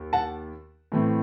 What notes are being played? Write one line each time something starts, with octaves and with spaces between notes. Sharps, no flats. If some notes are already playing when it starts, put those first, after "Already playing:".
Already playing: D#2
F#5 A5
A2 E3 A3 C4